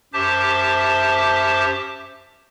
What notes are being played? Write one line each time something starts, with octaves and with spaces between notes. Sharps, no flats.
F#2 G4 C5 E5 A5 D6